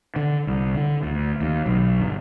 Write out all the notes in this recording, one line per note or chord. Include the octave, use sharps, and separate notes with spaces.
D3
C2
D3
D2
D#2
B1
G1